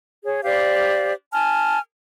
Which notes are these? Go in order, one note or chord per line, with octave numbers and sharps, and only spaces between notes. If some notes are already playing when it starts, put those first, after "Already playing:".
G#4 C#5
G4 C5 D5 F5
G#5 A5 F6